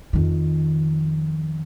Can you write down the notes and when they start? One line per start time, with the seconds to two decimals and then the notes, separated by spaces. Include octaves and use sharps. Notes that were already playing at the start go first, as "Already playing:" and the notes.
0.13 F2 D#3